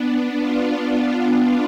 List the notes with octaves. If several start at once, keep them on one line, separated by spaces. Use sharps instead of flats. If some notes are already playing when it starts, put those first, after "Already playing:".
Already playing: B3 D4
D4 F4